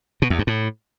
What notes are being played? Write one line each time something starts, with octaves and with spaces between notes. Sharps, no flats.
B2
E2
G2
A2